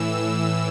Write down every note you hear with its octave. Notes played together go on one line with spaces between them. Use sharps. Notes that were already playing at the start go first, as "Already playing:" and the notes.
Already playing: A2 E3 E6